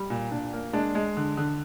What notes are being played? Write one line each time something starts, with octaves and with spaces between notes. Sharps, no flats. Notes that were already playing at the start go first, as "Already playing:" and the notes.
Already playing: G3
A#2
A#2 D4
A#3
G#3 D4
G#3
D3
D3